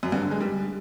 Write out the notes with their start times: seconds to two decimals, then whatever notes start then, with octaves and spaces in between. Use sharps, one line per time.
0.03 F#2
0.12 G2
0.22 D3
0.31 G#3
0.41 G3